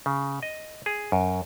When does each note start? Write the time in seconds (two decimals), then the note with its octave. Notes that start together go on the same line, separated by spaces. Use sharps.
0.06 C#3
0.43 D#5
0.86 G#4
1.12 F#2